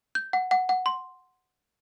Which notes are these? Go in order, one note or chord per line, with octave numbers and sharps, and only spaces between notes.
G6
F#5
F#5
F#5
C6